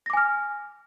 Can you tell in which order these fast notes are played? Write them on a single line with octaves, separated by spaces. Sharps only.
A#6 D6 G#5 F6